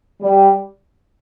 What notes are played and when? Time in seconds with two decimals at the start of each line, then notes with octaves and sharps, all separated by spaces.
0.21 G3